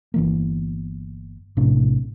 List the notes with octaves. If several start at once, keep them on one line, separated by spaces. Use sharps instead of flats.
G1 E3 A#3
A#1 A2 C3 D4